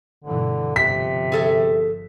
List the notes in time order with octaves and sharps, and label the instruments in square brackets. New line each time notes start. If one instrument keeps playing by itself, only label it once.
[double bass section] G2 B2 E3 [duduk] D3
[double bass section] G1 F3 [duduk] C3 [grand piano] B6
[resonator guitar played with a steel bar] G#4 A4 E5